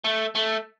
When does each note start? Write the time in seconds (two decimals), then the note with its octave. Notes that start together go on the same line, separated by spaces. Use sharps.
0.05 A3
0.35 A3